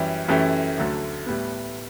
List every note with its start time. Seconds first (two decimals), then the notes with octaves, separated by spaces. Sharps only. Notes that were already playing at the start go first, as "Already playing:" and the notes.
Already playing: F#2 E3 G3 C#4 G4
0.28 F#2 E3 A3 C#4 G4
0.78 D2 D3 F#3 A3
1.27 A2 G3 B3